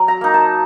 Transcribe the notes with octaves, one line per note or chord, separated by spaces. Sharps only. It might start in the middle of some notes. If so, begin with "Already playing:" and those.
Already playing: F#3
A#5
A#3 D#4
A5